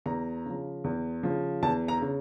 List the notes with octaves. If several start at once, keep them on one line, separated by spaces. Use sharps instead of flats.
E2 A#5
C#3 F3
E2
C#3 F3
E2 A5
A#5
C#3